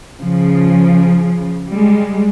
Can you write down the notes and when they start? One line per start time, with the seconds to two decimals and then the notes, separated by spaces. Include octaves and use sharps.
0.20 C#3 F3
1.69 G3 G#3